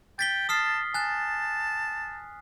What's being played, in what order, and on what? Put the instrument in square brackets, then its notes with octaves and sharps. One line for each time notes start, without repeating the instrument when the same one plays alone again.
[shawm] G5 [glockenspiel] A6 B6 G7
[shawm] A5 [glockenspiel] D#6 F6 C7
[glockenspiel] G#5 F#6 [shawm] A5